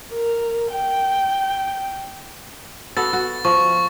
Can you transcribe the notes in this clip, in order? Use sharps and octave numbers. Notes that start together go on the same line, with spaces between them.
A#4
G5
B3 F#4 A4 A6
F#4
F3 C#6